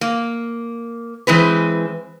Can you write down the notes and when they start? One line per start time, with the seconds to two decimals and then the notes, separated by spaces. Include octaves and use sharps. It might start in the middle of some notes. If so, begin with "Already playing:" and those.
0.01 A#3
1.27 E3 G#3 C4 B4